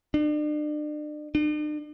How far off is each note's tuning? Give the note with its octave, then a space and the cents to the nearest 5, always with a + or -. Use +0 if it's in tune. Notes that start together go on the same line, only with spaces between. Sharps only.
D4 +40
D4 +45